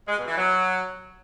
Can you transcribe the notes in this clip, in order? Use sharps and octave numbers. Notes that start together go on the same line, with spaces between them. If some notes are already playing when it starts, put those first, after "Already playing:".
G#3
B2
E3
F#3